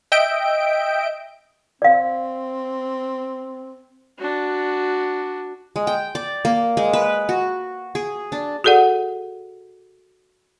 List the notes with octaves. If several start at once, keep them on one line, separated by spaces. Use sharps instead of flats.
D#5 E5 G5 G6 D7
C4 D5 F5
D4 F#4
G#3
G5
D5
A#3
G#3
B4
F#4
G#4
D4
F#4 G#4 A4 D5 F#5